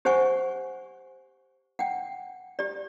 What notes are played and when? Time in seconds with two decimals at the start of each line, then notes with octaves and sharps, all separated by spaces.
0.05 G4 C5 F#5 G#5 C#6
1.79 F#5 G5
2.59 G4 D5